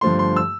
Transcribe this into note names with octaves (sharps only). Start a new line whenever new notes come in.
G2 D3 F3 A3 C6
C6
E6